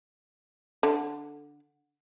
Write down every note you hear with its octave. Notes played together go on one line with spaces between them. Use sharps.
D3